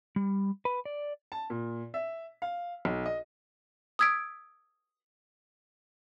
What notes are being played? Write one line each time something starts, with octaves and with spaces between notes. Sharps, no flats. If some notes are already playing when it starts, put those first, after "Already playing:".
G3
B4
D5
A5
A#2
E5
F5
B1
D#5
D#6 E6 G#6 B6 D7